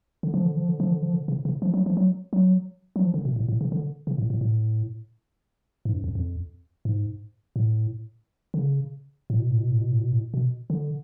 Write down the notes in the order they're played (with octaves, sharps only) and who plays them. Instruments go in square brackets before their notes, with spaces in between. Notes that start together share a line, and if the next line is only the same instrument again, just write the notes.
[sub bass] D3
F3
D3
F3
D3
F3
D3
F3
D3
C#3
C#3
F3
F#3
F3
F#3
F#3
F#3
F3
D3
B2
A2
A2
C#3
D3
C#3
A2
A2
A2
G#2
F#2
F2
F2
G#2
A2
D3
C#3
A2
B2
A2
B2
A2
B2
A2
B2
A2
B2
D3